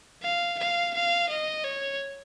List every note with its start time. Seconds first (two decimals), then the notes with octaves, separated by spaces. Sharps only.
0.23 F5
0.58 F5
0.94 F5
1.29 D#5
1.64 C#5